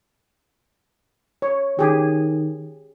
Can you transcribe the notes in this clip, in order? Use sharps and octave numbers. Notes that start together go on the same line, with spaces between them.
C#5
D#3 G4 G#4